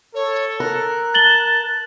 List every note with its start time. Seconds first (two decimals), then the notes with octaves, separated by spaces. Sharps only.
0.14 A4 C#5
0.60 A#4 F#6
1.14 A5 A6 F#7 G7